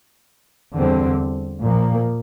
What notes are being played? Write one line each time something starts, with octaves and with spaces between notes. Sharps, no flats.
E2 D3 G3 C4
A#2 F3 A#3